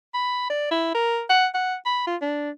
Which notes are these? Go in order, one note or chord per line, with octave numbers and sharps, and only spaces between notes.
B5
D5
E4
A#4
F#5
F#5
B5
F4
D4